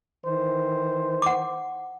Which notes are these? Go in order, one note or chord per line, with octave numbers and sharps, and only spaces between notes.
D#3 E3 C5
F#5 D6